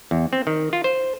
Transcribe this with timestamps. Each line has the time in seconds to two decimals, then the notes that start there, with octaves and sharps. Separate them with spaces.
0.11 E2
0.33 C4
0.47 D#3
0.73 F4
0.84 C5